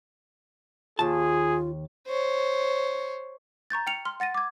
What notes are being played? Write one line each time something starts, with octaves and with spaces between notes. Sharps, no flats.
D#2 F4 G#4 A5
C5 C#5
A#5 C#6 G6 A6
G5 F6 C#7 F7
C6 F6
F#5 A6 A#6 D#7
D6 G#6